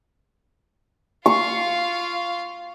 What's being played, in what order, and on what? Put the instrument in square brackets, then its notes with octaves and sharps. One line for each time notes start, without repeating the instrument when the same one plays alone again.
[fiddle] F4 F5 [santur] C#6